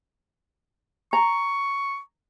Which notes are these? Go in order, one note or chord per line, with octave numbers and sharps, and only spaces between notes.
A#5 C#6